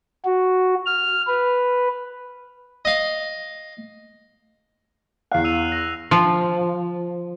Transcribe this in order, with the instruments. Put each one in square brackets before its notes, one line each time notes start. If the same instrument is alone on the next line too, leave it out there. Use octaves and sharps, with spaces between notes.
[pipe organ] F#4
F6
B4
[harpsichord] D#5 F5
[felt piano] E2 F5 [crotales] F#6 C7
[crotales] E6 D#7 F7
A#6
[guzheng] F3